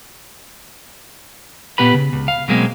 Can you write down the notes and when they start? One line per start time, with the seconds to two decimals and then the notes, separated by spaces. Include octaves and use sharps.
1.78 A#2 B3 G4 B4 B5
1.94 C#3
2.13 C#2
2.28 F5
2.48 B2 F#3 G#3 A#3 C4